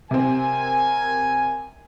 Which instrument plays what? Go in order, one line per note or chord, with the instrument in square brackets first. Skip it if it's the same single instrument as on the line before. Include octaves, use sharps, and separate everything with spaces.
[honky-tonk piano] C3 C4 [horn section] A#4 G#5